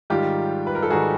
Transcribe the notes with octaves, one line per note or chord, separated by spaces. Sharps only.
G#2 D#3 G3 F4 G4
B4
A#4
A4
G#2 D#3 G3 F#4 G#4